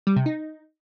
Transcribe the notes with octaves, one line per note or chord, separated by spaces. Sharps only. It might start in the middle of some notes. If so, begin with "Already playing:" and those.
G3
C3
D#4